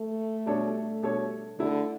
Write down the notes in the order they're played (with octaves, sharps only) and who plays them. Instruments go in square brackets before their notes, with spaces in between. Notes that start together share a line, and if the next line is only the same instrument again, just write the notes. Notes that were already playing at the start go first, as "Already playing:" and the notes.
Already playing: [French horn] A3
[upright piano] B2 G3 D4 A4 C#5
B2 G3 D4 A4 C#5
[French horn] D3 [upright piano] A3 E4 A4